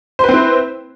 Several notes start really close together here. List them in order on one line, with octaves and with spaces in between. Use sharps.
C5 B4 C4 E4